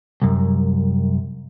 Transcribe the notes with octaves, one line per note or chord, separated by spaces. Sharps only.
C2 F#2